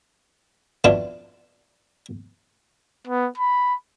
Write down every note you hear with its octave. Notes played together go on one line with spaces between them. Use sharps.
F2 B2 B3 D4 E4 F4
B3
B5